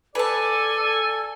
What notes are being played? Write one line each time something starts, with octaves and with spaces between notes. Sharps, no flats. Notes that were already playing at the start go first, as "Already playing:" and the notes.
A4 B4 D5 G#5 A5